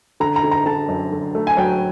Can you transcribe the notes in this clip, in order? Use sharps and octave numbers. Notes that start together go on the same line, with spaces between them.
D3 A#5
A#5
D3
A#5
D3 A5
F#2
D3
A3
G#5
F#3 G5